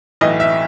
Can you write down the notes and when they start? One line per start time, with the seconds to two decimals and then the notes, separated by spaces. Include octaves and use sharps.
0.21 B1 A2 E3 D#5
0.40 E5